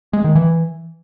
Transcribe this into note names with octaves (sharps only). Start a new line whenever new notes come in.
G#3
D#3
E3